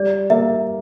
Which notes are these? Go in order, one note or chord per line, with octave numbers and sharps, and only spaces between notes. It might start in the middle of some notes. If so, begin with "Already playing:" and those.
Already playing: G3 D5
A#3 E5